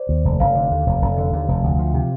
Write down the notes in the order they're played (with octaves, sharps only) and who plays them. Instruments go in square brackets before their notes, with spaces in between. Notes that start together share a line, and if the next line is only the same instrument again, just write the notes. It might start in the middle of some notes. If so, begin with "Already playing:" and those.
Already playing: [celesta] C5 D5
[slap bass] D#2
F1
[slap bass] F1 [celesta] F5
[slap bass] D3
D#2
F1
F1
D3
D#2
F1
D2
F3
C3